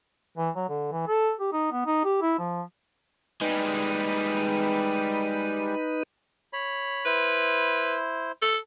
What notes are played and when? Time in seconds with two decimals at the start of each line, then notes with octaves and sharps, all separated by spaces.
0.38 E3
0.56 F#3
0.69 D3
0.92 E3
1.08 A4
1.40 G4
1.53 D#4
1.72 B3
1.86 D#4
2.04 G4
2.22 E4
2.39 F3
3.41 G3 G#3 D#4 B4
6.53 C#5 B5
7.05 E4 B4 C5
8.42 A4